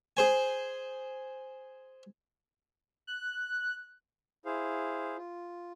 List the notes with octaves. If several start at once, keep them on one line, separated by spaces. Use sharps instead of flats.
G#4 C5 G#5
F#6
E4 G#4 C5 F5
F4